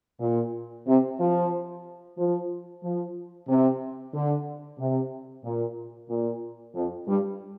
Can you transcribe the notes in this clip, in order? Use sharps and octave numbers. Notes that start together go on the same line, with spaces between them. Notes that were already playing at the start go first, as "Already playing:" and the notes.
A#2
C3
F3
F3
F3
C3
D3
C3
A#2
A#2
F2
G2